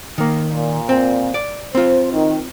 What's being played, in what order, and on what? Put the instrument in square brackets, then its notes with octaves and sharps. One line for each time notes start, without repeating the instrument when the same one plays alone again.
[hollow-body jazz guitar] D#3 A#3
[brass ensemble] A#2
[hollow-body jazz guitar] C4
D5
[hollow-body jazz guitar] C4 F4 [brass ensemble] C5
[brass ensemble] D#3